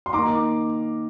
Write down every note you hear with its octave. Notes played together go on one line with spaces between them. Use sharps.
C6
D#3 A#3 A#5 D6